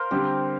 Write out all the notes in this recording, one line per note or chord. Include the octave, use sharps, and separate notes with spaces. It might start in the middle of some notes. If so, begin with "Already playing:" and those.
Already playing: A#4 C5 F5
D3 G3 C4 G4